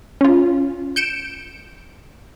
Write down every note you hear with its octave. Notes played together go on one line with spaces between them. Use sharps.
C#4 F4
G6 C#7 D7 E7